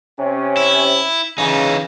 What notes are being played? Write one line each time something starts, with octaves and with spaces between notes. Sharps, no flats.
C3 C#4
E4
C#3 E3 D#4